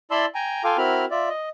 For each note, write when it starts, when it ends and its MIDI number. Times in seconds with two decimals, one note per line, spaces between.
0.11 0.26 64
0.11 0.26 74
0.11 0.26 81
0.11 0.26 83
0.11 0.26 84
0.11 0.26 88
0.35 0.64 79
0.35 0.64 80
0.35 0.64 82
0.64 0.77 65
0.64 0.77 69
0.64 0.77 77
0.64 0.77 79
0.64 0.77 80
0.64 0.77 86
0.78 1.05 60
0.78 1.05 64
0.78 1.05 66
0.78 1.05 70
0.78 1.05 83
0.78 1.05 89
1.11 1.29 65
1.11 1.29 74
1.11 1.29 76
1.29 1.49 75